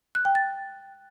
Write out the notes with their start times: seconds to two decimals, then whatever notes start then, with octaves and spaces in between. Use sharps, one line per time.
0.15 F#6
0.25 G5
0.35 A6